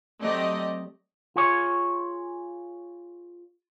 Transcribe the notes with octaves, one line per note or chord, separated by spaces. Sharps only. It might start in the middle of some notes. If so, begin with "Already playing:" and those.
F#3 A3 C4 G4 D5 D#5
F4 G#4 C#5